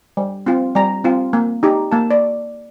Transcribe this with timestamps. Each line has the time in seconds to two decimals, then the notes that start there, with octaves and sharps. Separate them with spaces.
0.17 G3
0.46 C4 F4
0.75 G3 A#5
1.04 C4 F4
1.33 A#3
1.63 D#4 G4
1.91 A#3 A5
2.11 D5